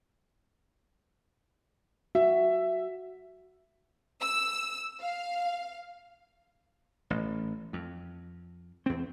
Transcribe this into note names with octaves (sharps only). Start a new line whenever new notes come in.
F#4 E5
E6
F5
A1
F2
E2 C4